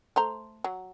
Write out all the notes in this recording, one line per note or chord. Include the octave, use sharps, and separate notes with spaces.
A3 C5 A#5
F#3